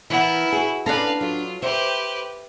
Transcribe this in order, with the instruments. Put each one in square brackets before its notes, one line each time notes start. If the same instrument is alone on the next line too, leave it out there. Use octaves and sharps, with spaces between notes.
[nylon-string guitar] E3 [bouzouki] B3 A#4 [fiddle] E4
[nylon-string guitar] F#4 G#4
[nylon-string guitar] B3 C#4 A4 [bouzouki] D4 A#5 [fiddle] B4 F5
[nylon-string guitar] F#3 [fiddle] F4
[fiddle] G4 B4 [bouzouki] C5 [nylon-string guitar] E5